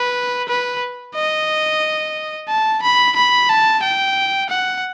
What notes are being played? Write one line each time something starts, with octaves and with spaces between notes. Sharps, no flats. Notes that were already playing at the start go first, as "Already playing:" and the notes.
Already playing: B4
B4
D#5
A5
B5
B5
A5
G5
F#5